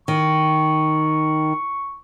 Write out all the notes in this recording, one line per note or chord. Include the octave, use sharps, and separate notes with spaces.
D#3 C#6